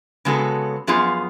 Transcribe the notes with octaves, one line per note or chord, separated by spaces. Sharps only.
C#3 G#3 B3 F#4 A4
F#2 F3 B3 F4 G#4